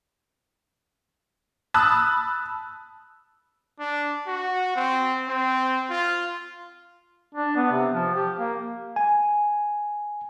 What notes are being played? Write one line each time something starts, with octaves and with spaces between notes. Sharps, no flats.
A5 B5 D#6 E6 F#6
D4
F#4
C4
C4
F4
D4
B3
C3
F3
G4
A#3
G#5